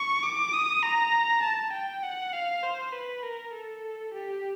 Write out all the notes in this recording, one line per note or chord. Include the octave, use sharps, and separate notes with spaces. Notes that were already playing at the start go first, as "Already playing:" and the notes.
Already playing: C#6
D6
D#6
A#5
A5
G5
F#5
F5
C5
B4
A#4
A4
G4